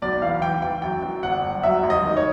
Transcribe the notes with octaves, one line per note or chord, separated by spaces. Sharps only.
B1 D5
E3 F5
E3 G5
E3 G5
F#2 G5
F#2
G1 F#5
G1
F#3 E5
A1
D#5
D#3
C#5